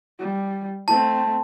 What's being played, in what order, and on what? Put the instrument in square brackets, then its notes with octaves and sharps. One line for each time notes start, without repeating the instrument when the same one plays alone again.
[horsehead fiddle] G3
[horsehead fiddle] A3 C4 [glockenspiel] A5